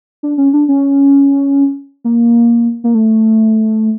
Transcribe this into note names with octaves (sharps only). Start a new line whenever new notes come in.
D4
C#4
D4
C#4
A#3
A#3
A3